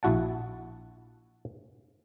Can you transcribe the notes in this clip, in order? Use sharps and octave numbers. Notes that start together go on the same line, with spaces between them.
A#1 E4 F#4 F#5 A5